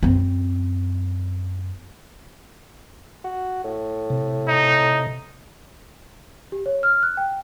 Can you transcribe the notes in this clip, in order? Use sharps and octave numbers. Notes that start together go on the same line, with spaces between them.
F#2 C4
F#4
A2
C3
D#4
G4
C#5
F6
F#6
G5